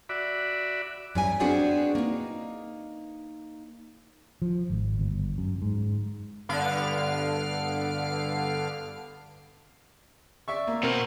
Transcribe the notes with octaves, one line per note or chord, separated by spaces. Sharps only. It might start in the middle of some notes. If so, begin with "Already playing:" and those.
F#4 D5 E5 B5
F#2 G3 G#5
B3 C4 D4 F#4 G#4 F#5
A#3 D#4
F3
G#1
G1
F#2
G#2
G2 D3 B3 F5 F6 D7
D5 E5 C#6
A#3
B2 B3 C4 A#4